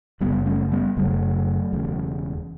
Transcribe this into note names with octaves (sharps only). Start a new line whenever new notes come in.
F#1 F#2 C#3 G3 B3
A3 C#4
G3 B3
F#1 F#2 C#3 F#3 A3
E1 E2 C#3